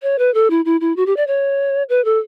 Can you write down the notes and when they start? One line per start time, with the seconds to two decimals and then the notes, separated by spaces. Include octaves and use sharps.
0.02 C#5
0.18 B4
0.34 A4
0.50 E4
0.65 E4
0.81 E4
0.96 F#4
1.06 G4
1.17 D5
1.27 C#5
1.89 B4
2.05 A4